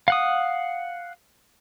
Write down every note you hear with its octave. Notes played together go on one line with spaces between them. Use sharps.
F5 F#5 D#6